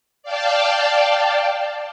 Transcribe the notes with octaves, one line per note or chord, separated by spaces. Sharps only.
D5 F5 G5 A5